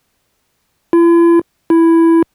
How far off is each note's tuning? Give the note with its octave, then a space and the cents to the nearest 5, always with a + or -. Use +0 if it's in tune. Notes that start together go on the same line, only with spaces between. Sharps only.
E4 +45
E4 +5